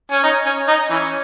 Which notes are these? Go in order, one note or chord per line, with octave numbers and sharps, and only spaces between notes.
C#4
D#4
C#4
D#4
E3 C#4